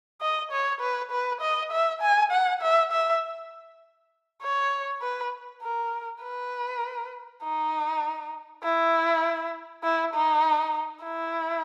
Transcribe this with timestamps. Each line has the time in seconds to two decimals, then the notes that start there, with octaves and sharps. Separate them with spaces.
0.21 D#5
0.52 C#5
0.81 B4
1.11 B4
1.41 D#5
1.72 E5
2.02 G#5
2.32 F#5
2.62 E5
2.92 E5
4.43 C#5
5.02 B4
5.62 A#4
6.23 B4
7.43 D#4
8.64 E4
9.84 E4
10.14 D#4
11.03 E4